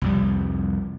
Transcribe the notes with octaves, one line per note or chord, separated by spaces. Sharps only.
C2 F2 G3